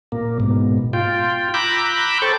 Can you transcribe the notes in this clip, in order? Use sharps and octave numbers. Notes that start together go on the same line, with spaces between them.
A#2 A#3
G#2 B2
F4 G5
A#5 B5 D6 E6 F#6 G6
A4 C5 G5 A5 C#6